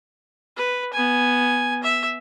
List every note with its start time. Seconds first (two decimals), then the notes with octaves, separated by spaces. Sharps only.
0.57 B4
0.94 B3 G#5
1.83 E5